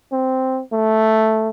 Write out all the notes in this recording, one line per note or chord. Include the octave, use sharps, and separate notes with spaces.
C4
A3